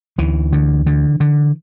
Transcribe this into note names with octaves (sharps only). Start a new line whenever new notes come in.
D2 E3
D3
D3
D3